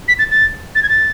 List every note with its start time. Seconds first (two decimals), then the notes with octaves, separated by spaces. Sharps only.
0.08 B6
0.19 A6
0.31 A6
0.75 A6
0.83 G#6
0.89 A6